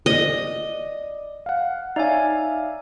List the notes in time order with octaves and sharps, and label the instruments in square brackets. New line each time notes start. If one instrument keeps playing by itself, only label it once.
[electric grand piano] D5 [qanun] D#5
[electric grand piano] F5 F#5
[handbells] D#4 C#5 G#5 [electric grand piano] D5 E5 F5